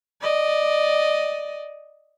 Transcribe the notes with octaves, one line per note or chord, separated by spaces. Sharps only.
D5 D#5